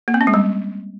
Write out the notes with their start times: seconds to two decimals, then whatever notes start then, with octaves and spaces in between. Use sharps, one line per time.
0.08 A#3
0.14 C4
0.21 C#4
0.27 G#3
0.34 G3